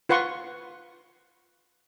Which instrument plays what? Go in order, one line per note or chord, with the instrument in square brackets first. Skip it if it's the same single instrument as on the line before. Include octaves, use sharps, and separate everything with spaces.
[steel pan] F4 B4 F#5 C6 C#6